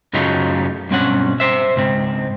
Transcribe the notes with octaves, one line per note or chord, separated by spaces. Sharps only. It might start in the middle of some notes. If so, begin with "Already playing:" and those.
F#2 C#3 F#3 A3 D#4 F4
B1 G2 C4 C#4 F#5
C5 E5
C#2 G#2 C4